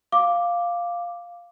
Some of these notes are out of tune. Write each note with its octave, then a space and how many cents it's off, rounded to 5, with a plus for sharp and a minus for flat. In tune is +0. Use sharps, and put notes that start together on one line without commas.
F5 +0 D6 +0